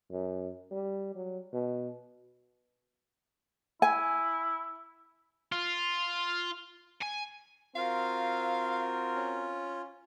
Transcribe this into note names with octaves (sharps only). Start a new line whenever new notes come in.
F#2
G3
F#3
B2
E4 G#5
F4
G#5
C4 F4 F#4 A#4 F5
C#4